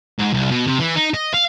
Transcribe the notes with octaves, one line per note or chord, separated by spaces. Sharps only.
G#2
C2
B2
C3
E3
D#4
D#5
F5